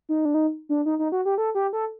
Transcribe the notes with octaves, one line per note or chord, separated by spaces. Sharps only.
D#4
D4
D#4
D4
D#4
D#4
F#4
G4
A4
G4
A4